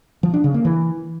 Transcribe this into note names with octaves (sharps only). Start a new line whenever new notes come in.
F3
D4
C#3
A#3
E3